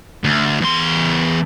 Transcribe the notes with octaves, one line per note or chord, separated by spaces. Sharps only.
D2
E2 C6